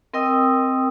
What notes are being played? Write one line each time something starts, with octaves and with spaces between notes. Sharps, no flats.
C4 A#4 D#5 G5 D#6 E6